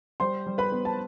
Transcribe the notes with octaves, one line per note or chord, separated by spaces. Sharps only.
G3 C5 C6
G3
B4 B5
B3
A5